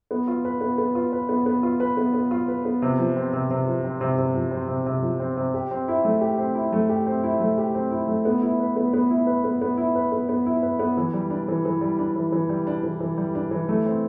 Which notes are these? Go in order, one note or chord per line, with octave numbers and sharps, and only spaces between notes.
B3
F4
B4
B3
B3
F4
B4
B3
B3
F4
B4
B3
B3
F4
B4
B3
C3
F3
C4
C3
C3
F3
C4
C3
C3
F3
C4
C3
C3
F3
C4
C3
G4
C4
E4
A3
G4
C4
E4
A3
G4
C4
E4
A3
G4
C4
E4
A3
B3
E4
B4
B3
B3
E4
B4
B3
B3
E4
B4
B3
B3
E4
B4
B3
E3
G3
D4
E3
E3
G3
D4
E3
E3
G3
D4
E3
E3
G3
D4
E3
A3
C4